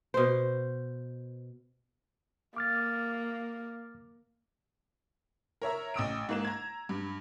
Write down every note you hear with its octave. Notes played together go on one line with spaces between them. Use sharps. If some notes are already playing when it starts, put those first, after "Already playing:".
B2 C5
A#3 D6 F6 A6
A#4 C#5 E5 A#5
A1 D#6 E6 D7
G#2 A#3 E7
A#5 G#6
G2